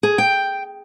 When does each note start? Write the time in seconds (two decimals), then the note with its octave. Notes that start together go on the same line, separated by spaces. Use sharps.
0.03 G#4
0.18 G5